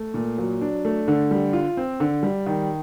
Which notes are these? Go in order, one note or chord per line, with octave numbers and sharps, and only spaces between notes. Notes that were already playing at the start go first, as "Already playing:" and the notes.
Already playing: A3
A#2
F#3
D4
A3
D3
G3
F4
C4
D3
G3
D#3